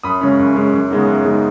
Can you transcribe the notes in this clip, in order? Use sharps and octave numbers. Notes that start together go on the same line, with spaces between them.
F#2 B5 D#6
C#3 G#3 C#4
F#2
C#3 G#3 C#4
F#2
C#3 G#3 B3 D#4
F#2
C#3 G#3 B3 D#4